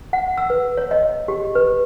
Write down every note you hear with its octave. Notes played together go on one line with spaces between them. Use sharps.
F#5
E6
B4
C#5
D#5
G4
B4